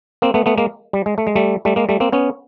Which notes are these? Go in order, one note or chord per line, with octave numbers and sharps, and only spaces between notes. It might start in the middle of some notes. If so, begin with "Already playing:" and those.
A#3 C4
A3 B3
A3 B3
G#3 A#3
G3
G#3
A3
G#3
G3 A3
G3 A3
G#3 A#3
G3 A3
A#3 C4
B3 C#4